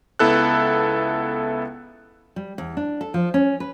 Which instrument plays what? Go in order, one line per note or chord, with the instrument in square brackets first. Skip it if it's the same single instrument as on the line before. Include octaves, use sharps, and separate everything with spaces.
[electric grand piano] C#2 B3 E4 A4 F#6
[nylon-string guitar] G3
E2
D4
A4
F3
C#4
B4